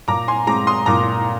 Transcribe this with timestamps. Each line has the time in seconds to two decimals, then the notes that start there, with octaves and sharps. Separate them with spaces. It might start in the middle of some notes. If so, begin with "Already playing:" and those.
0.08 A#2 A#5 D6
0.28 G#5 C6
0.47 G#3 C4 A#5 D6
0.67 C6 D#6
0.86 A#2 A#5 D6